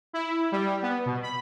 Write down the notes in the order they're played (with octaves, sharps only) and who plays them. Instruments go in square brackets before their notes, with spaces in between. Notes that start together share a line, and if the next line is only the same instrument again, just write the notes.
[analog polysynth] E4
G3
B3
B2
B5